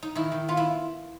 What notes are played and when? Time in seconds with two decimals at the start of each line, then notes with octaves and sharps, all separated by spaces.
0.03 D#4
0.15 D#3 E4
0.32 D#3
0.48 B3 F4
0.57 E4